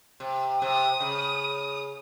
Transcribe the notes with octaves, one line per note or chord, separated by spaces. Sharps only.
C3
C3 D#6
C#3